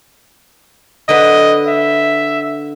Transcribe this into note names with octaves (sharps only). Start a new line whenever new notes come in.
D3 B4 D#5
E5